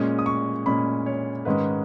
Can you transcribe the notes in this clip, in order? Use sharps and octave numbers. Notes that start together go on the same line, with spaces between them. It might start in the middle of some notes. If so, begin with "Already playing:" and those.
Already playing: A#2 G#3 C#4 D#6
D#6
C#6
A#2 G#3 C#4 B5
C#5
G#2 D#3 G#3 C#4 B4